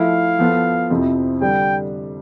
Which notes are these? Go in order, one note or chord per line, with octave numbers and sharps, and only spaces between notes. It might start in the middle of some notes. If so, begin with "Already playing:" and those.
Already playing: F3 A3 E4 F5
F3 B3 F4 A4
F2 C3 F3 C4 E4
D3 G3 D4 G5